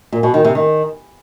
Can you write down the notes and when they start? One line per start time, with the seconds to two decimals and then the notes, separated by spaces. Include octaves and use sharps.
0.12 A#2
0.23 B2
0.34 D#3
0.44 C3
0.55 D#3